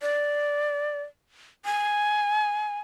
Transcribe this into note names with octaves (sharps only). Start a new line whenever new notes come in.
D5
G#5